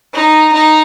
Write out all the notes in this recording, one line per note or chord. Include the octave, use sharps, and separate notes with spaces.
D#4
D#4